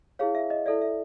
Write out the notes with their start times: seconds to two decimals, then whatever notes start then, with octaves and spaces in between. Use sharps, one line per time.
0.19 E4 G#4 C#5 F5
0.35 E5
0.50 D#5
0.66 E4 A4 D5 E5
0.82 E5